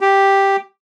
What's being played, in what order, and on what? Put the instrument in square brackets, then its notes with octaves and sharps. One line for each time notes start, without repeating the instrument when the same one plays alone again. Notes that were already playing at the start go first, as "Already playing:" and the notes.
[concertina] G4